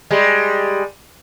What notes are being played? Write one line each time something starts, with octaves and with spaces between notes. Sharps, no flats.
G3 G#3